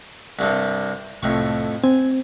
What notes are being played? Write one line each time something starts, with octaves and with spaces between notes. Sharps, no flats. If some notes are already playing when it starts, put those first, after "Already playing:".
C2 G2 C3
C2 F2 A2 C#6
C4 G#5